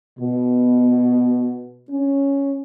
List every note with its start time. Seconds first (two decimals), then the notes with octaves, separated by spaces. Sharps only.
0.20 B2
1.91 C#4